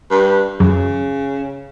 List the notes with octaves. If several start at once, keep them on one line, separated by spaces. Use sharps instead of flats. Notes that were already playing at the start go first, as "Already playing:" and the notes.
G2
F#2 C#3